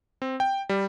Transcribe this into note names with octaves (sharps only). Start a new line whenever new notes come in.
C4
G5
G3